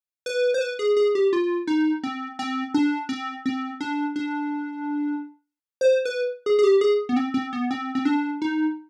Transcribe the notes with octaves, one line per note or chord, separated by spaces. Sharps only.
B4
C5
B4
G#4
G#4
G4
F4
D#4
C4
C4
D4
C4
C4
D4
D4
C5
B4
G#4
G#4
G4
G#4
B3
C4
C4
B3
C4
C4
D4
D#4